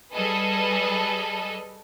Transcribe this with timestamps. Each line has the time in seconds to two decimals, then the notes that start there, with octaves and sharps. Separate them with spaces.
0.13 G3 G#4 A4 B4 D#5